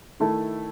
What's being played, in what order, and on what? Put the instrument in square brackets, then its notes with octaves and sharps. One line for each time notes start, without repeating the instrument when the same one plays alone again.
[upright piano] D#3 A3 E4 A4